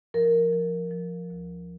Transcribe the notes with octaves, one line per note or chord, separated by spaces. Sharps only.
F3 A#4
F3
F3
D2